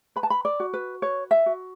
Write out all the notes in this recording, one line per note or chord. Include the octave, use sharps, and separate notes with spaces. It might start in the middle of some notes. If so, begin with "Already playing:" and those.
B4 B5
A5
B5
D5
F#4
B4
B4 C#5
E5
F#4